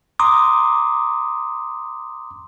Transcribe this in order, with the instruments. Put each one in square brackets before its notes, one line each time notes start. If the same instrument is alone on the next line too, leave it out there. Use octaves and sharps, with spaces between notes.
[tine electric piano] A#5 C6 D6 D#6